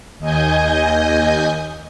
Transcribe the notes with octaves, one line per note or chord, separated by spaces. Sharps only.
D#2 D#5 G#5 G6